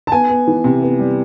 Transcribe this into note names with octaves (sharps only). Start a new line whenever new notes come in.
A5
B3 G#5
B3
E3
C3
B3
G3